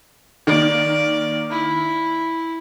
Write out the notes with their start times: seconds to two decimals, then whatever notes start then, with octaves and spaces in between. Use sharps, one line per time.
0.47 D#3 A#3 D5
1.50 E4